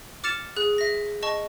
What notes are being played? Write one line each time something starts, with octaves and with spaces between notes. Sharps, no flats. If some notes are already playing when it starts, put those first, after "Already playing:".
D6 F6 A6 C#7 E7 F7
G#4 F#6
E5 A#6
D#5 A5 C#6